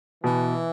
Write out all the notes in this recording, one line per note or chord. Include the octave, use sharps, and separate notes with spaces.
B2 E3